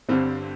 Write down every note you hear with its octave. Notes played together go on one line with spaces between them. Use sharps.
G1 G2 D3 G3 C4